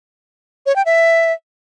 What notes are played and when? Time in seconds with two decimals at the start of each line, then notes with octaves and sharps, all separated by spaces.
0.66 C#5
0.76 G5
0.86 E5